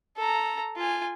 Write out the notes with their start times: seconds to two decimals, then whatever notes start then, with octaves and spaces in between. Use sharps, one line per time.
0.17 A4 A#5
0.76 F4 G#5